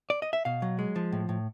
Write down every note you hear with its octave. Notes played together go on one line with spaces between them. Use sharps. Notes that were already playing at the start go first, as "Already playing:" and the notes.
D5
D#5
E5
B2 F5
F#3
G#3
F3
A2
A2